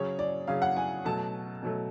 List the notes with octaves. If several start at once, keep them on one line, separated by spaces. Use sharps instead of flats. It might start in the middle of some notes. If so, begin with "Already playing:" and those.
Already playing: C#3 F#3 C#4 G#4 C#5
D5
C#3 F#3 C#4 G#4 F5
F#5
G#5
B2 F#3 A3 A5
B2 F#3 A3